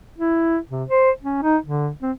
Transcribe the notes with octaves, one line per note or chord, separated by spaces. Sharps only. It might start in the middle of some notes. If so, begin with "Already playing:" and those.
E4
C3
C5
C#4
D#4
D3
C4